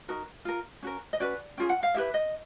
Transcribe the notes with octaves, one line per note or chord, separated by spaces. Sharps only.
D#4 F#4 A#4
F4 A#4
C#4 F#4 A#4
D#5
C#4 F#4 B4 D5
C#4 F4 G#4 G5
F#5
F5
E4 G4 B4 E5
D#5